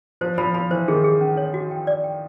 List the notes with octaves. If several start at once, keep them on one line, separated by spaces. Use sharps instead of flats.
F3 C5
F3 B5
F3 B5
E3 C5
D#3 G#4
G#4
C#4
C#5
F#4
G5
D5
G5